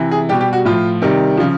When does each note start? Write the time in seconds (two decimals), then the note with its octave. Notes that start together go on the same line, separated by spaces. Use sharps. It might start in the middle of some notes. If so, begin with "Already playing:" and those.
Already playing: C3 E3
0.11 G#4
0.29 B2 G3 G4
0.41 G4
0.53 F#4
0.65 A2 F3 F4
1.02 C3 D#3 G3
1.37 C#3 F3